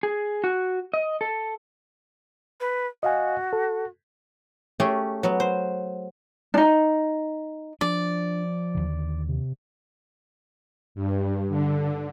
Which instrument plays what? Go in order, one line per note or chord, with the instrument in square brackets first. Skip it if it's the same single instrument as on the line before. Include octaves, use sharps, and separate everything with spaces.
[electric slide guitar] G#4
F#4
D#5
A4
[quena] B4
[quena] F#4 [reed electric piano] D#5 F5 G#5
[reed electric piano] A4
[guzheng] A3 C#4 G4 G#4
F#3 B3
C5
[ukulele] D4 D#4
[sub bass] F3 [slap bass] D4 [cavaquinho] D5
[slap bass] D#2 D3
[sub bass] C3
[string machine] G2
D3